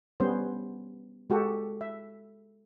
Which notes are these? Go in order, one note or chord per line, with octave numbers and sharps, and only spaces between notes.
G3 B3 C#4 C5
G#3 F#4 G4 A4
E5